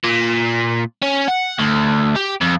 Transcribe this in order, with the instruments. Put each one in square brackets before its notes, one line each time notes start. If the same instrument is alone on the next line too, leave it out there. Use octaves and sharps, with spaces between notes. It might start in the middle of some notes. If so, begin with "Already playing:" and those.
[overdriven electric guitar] A#2
C#4
F#5
D2
G4
F2